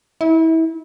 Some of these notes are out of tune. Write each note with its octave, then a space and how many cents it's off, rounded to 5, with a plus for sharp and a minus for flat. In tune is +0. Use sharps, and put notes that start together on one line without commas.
E4 -30